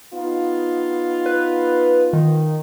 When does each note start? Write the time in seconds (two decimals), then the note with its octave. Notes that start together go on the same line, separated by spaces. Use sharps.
0.14 B3 D#4 F4
1.26 B4
2.13 D#3